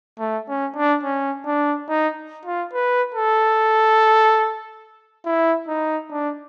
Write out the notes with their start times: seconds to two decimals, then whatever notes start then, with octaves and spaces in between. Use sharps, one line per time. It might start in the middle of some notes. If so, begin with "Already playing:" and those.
0.19 A3
0.48 C#4
0.76 D4
1.03 C#4
1.46 D4
1.89 D#4
2.45 F4
2.73 B4
3.14 A4
5.26 E4
5.68 D#4
6.11 D4